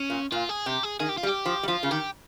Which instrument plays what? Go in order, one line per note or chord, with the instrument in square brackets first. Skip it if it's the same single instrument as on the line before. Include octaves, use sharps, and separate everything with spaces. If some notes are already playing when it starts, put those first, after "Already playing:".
Already playing: [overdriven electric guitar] C#4
[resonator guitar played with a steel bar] A#2
[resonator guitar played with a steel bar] A#2 [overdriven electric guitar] F4
[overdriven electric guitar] G#4
[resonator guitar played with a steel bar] C3 [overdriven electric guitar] G4
[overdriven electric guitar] G#4
[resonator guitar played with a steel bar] D#3 [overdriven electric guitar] G#4
[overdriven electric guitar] G4
F4
[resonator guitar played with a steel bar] G3
[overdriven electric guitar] G4
[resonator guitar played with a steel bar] F3
G3
[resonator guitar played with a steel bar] F3 [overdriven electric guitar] F4
[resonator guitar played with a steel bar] C#3
[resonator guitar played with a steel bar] D#3 [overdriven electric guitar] G4